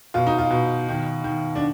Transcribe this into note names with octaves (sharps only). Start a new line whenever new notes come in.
B2 F4
D#4
F4
B2
D#3
D#3
D4